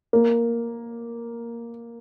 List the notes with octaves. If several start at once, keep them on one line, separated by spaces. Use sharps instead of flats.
A#3